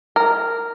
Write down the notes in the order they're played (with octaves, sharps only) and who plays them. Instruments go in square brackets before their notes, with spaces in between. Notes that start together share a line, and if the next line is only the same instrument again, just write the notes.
[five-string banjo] A#4